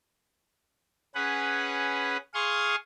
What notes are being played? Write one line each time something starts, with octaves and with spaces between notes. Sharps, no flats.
C#4 G#4 B4 F#5
G#4 F5 C6 C#6 D#6